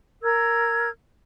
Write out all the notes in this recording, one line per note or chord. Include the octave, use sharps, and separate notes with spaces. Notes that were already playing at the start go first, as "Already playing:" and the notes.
A#4 E6 G#6